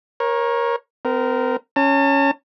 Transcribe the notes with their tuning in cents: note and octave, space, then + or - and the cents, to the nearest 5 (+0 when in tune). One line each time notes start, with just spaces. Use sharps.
A#4 +20 C#5 -20
C4 -40 A#4 +0
C#4 +0 A5 +40